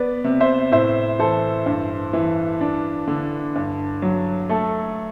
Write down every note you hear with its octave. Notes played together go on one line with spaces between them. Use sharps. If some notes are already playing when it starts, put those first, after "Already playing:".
Already playing: B3 B4 D5
C3
C5 E5
A2 C5 E5
E3 A4 C5
G2
E3
D4
D3
G2
F#3
A3 A4